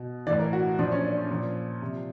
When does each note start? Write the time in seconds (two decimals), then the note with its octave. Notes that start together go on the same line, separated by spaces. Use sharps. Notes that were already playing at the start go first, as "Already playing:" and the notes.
Already playing: B2
0.27 E3 D5
0.31 A2
0.39 A#4
0.53 F#4
0.79 A#2 F3 D4
0.92 C#4
1.04 D4
1.17 C#4
1.30 A#2 F3
1.82 C3 F3